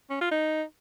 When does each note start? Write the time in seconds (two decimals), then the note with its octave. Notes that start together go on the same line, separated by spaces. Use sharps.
0.10 C#4
0.21 F4
0.31 D#4